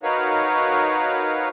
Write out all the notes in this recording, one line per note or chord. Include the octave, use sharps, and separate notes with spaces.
D#4 F#4 A#4 B4 C#5 F5